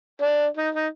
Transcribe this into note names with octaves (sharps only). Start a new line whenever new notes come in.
D4
D#4
D#4